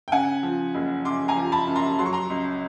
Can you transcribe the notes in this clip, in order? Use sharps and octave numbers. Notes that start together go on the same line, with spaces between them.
G5
C#3 F#5 G#5
F3
F#1
C#3 C6 D6
G#5 A#5
F3
A5 B5
F#2
A#5 C6
F#3 C6
C#6
A#5 C6
C#2